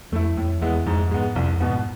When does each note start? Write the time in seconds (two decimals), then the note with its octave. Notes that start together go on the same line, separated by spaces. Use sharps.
0.12 F2 A3 E4
0.37 F2 A2
0.61 E2 G#3 B3 E4
0.86 F2 G#2
1.11 G#2 G#3 B3
1.35 C2 F2
1.60 G#2 B2 B3